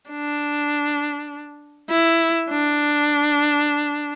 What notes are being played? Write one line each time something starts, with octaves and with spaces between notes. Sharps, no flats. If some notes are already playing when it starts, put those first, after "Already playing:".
D4
E4
D4